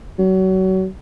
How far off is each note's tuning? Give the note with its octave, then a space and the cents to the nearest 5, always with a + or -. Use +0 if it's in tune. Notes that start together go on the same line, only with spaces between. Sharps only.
F#3 +30